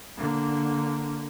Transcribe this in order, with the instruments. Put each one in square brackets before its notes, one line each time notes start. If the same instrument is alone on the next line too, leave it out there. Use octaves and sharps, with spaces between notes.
[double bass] D3 A#3